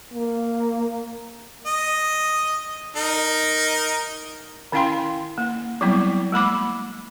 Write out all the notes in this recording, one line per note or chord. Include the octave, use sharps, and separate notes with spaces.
A#3
D#5
D#4 A#4
D#3 C#4 E4 F5 G5 C6
A#3
F#3 G3 B3 C4 E4
G#3 A#3 B5 D6